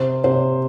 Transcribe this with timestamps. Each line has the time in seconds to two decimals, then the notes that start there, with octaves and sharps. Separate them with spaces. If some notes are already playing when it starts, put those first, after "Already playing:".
Already playing: C3 C5
0.24 C3 C5